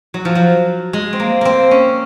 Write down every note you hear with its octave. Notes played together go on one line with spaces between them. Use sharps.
F#3
F3
F#3
G#3
C4
A#3
A#3 C4
C#4